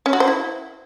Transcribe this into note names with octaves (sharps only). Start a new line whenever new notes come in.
C#4
F#4
C5
E4